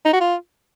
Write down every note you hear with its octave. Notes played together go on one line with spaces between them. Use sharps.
D#4
F#4
F4